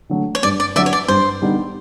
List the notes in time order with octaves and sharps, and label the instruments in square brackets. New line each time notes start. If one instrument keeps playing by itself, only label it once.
[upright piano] D3 F#3 A3
[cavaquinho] C#5
[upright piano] G2 [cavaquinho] D5
[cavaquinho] D5
[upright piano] D3 F#3 [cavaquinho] D5 E5
[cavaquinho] C#5
D5
[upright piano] G2 [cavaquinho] C5
[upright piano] D3 G3 B3 D#4